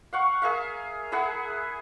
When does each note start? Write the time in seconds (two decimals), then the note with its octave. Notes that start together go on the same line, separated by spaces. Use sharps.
0.13 F5 F#5 C#6
0.42 G#4 A#4 E5 F5
1.12 E4 G#4 E5 F#5